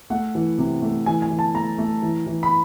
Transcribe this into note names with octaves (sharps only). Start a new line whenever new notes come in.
A3 F#5
E3
C3
A3
E3 G#5
G#5
E3
A5
A3 A#5
A3
E3
E3
B5